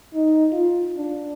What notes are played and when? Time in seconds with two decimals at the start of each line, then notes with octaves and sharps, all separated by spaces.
0.14 D#4
0.52 F4
0.97 D4